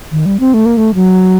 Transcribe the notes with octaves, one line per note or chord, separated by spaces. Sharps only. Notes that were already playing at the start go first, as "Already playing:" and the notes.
D#3
G3
C4
A3
A#3
A3
F#3